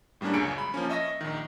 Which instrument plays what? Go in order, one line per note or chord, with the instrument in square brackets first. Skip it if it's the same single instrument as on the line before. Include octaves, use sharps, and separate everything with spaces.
[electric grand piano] A2 G3 A#3 C#4 D4
C#2 F#2 C#3 C#7 D7
B5
F3 A#3 C#4
D#5 E5 C#6 A#6
A#1 D#3